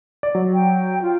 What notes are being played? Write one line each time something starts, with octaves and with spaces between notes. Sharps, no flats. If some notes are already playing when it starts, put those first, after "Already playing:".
D5
F#3
G5
F4